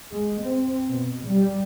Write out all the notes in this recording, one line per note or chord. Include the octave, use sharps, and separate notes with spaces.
G#3
C4
B2
G3